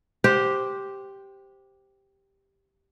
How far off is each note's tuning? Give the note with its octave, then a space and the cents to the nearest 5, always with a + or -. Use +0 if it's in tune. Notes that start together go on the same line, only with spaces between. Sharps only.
G4 +0 C5 +0 F#5 -30